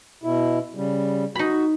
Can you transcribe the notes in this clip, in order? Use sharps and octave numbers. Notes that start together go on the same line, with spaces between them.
B2 E4
C#3 G3
D#4 F#4 B5